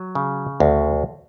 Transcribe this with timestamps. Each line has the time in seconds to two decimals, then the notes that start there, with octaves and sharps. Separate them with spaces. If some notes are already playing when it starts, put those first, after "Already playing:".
Already playing: F#3
0.15 C#3
0.60 D2